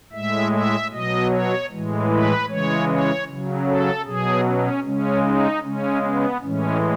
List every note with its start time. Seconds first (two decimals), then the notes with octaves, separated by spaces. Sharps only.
0.12 A2 G#3 E5
0.52 E5
0.91 B2 F#3 D#5
1.30 C#5
1.71 A2 E3 G#3
2.10 B4
2.49 C#3 E3 G#3 C#5
2.88 C#5
3.28 C#3 F#3
3.66 A4
4.05 B2 F#3 G#4
4.45 C#4
4.84 C#3 G#3 C#4
5.23 D#4
5.63 C#3 G#3 C#4
6.02 B3
6.42 A2 E3 G#3 C#4